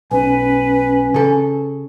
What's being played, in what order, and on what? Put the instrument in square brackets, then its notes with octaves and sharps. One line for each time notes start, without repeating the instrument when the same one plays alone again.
[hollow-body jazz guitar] B1 [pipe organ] C#4 [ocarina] B4
[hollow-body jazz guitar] C#3 A4